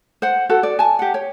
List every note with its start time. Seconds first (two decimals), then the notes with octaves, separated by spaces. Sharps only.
0.22 C5 F#5
0.50 F#4 A4 F#5
0.63 D5
0.79 G#5 A5
0.99 G4 F#5
1.14 C#5